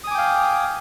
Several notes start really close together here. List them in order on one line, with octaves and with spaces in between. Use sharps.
D#6 G#5 D6 G5 F5